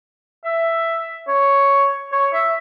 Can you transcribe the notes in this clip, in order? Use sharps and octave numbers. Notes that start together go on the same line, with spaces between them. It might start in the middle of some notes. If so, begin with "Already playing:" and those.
E5
C#5
C#5
E5